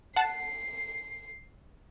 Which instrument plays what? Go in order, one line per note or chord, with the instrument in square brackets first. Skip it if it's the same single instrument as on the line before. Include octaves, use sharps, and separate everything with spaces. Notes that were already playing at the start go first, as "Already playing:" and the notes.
[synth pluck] F#5 A5 [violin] C7